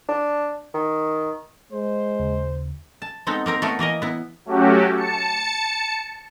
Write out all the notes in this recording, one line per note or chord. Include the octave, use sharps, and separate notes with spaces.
D4
D#3
G#3 C5
D#2 C#3
A5
G#3 B3 C4 D#4 A4
A#3 C4 A#4 F5
A3 B3 A4 A#4 C#5
E3 A#3 A#4 D#5
B3 E4
F#3 A3 C#4 F#4 G4
A5 C#7